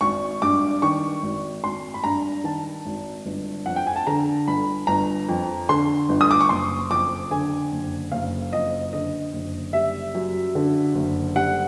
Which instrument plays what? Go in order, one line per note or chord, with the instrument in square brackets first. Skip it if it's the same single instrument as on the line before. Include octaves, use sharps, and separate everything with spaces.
[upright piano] G#1 C#6
G2 D6
D#3 C#6
G#1
G#1 C6
B5
G2 A#5
D#3 A5
G#1
G1
F2 F#5
G5
G#5
A5
D3 A#5
G1 B5
G1 A#5
F2
D3 C6
G1
D#6
D6
C#6
F#1 C6
F2 D6
D3 G#5
F#1
F#1 F5
F2 D#5
D3 D#5
F#1
G3 E5
F#2
D3
F#1
G3 F#5